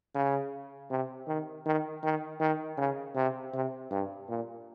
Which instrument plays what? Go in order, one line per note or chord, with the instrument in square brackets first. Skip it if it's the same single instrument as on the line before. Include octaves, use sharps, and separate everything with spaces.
[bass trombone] C#3
C3
D#3
D#3
D#3
D#3
C#3
C3
C3
G2
A#2